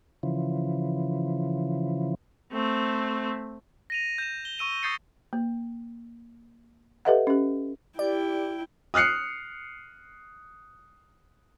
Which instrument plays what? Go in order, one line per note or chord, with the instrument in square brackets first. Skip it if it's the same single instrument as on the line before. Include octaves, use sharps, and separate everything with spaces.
[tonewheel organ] C#3 E3 F3
[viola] A3 C4
[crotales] A#6 D#7 F7
G6 E7
G7
C#6 E6 D#7 E7
C#6 D#6 G6 A6 C7 C#7
[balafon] A#3
G4 A4 B4 D#5 E5 F#5
C#4 G4
[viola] E4 G5 [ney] G4 [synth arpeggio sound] D5
[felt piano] D#6 F6 F#6 C7 C#7